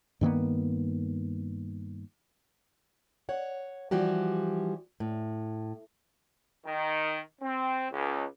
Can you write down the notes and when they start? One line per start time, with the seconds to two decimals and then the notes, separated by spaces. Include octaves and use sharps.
0.21 G2 D#3 A#3 B3
3.29 C#5 F#5
3.91 E3 F3 G3 F#4 G4
5.00 A2
6.65 D#3
7.42 C4
7.91 C#2